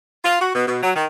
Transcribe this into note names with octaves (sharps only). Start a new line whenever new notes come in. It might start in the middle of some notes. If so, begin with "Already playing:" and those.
F4
F#4
B2
B2
F#3
D#3